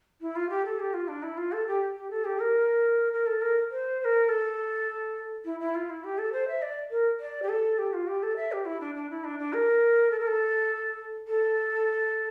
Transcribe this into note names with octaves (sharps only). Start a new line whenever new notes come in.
E4
F4
G4
A4
G4
F4
D4
E4
F4
A4
G4
G4
A4
G4
A#4
A#4
A4
A#4
C5
C5
A#4
A4
E4
E4
F4
E4
G4
A4
C5
E5
D5
A#4
D5
G4
A4
G4
F4
G4
A4
E5
G4
E4
D4
D4
E4
D4
D4
A#4
A4
A#4
A4
A4